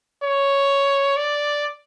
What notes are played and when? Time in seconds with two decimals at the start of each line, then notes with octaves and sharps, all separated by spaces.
0.23 C#5
1.17 D5